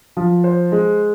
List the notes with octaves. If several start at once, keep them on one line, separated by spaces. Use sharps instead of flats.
F3
C5
G#3